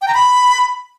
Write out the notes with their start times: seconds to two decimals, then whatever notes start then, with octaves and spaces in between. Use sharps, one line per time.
0.02 G5
0.08 A#5
0.14 B5